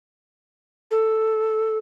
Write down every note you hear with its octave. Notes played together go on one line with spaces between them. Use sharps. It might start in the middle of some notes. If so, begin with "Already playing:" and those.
A4